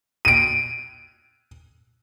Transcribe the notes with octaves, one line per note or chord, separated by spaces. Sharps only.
D7 D#7